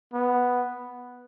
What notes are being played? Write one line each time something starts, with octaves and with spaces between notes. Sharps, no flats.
B3